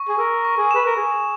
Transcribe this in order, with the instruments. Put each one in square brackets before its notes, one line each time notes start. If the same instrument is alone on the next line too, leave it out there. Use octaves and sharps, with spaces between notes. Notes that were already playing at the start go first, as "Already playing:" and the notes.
Already playing: [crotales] C#6
[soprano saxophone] G#4
[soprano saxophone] A#4 [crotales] E6
[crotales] C#6
[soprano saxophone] G#4
[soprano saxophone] B4 [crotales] E7
[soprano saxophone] A#4
[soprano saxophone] G#4 [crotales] C#6